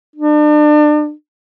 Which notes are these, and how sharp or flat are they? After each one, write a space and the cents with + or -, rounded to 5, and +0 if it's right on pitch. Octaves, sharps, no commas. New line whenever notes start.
D4 +35